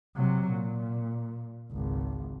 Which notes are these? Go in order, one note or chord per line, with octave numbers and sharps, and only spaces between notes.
C3 F#3
A#2
G#1 C#2